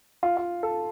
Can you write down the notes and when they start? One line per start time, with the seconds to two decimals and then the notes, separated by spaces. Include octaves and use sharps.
0.23 F4
0.37 F4
0.63 A4